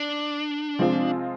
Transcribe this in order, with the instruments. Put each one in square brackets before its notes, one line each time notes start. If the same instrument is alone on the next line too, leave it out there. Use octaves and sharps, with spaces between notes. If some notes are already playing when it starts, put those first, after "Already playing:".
Already playing: [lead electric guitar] D4
[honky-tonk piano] C3 F3 G#3 C4 F4